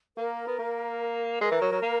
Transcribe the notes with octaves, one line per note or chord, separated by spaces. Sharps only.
A#3 A#4
B3
A#3
G#3 A#4
E3
F#3
F#3
A#3